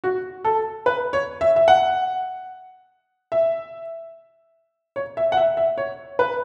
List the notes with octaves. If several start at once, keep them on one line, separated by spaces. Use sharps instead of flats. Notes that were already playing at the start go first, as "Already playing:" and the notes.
F#4
A4
B4
C#5
E5
E5
F#5
E5
C#5
E5
F#5
E5
E5
C#5
B4